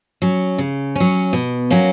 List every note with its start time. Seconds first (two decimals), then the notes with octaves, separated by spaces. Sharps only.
0.22 F#3 C#4
0.58 C#3
0.96 F#3 C#4
1.33 B2
1.71 F#3 A#3 C#4